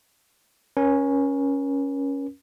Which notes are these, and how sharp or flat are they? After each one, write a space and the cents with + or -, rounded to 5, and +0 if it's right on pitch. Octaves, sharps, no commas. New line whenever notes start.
C#4 +0 A#4 +40